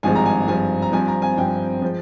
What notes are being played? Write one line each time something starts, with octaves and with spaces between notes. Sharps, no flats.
G#1 G2 F3 G#3 G#5
A#5
G#5
G#1 G2 F3 G#3 G#5
A#5
G2 F3 C4 G#5
A#5
G#5
G2 F3 C4 G5
F3 G#3